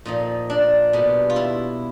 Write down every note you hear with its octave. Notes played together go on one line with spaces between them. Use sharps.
A#2 F3 D#4
D4
B2 G3
F4
E4